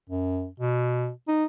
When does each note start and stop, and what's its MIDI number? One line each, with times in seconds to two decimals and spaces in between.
0.10 0.47 42
0.60 1.10 47
1.28 1.45 63